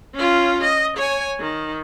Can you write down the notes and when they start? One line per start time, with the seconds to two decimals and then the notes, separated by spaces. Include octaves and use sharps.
0.14 C#4 F4
0.63 D#5
0.97 C#5 G#5
1.39 D#3